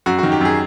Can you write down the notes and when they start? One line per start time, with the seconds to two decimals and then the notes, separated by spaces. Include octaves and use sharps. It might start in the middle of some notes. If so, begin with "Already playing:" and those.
0.06 F#2 F#4
0.19 F#4
0.23 D#3
0.32 G4
0.41 F#2 G#4